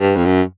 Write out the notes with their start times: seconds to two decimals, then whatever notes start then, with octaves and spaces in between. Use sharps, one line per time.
0.01 G2
0.16 F2
0.26 F#2